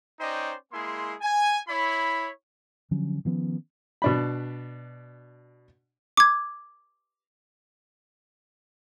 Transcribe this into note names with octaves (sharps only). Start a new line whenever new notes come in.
C#4 D#4 C5 D5 D#5 G5
G#3 A#3 E4 G#4 C6
G#5
E4 C#5 B5
D3 F3 F#3 C#4
D#3 F3 B3 C#4
B2 D4 B5
D6 G#6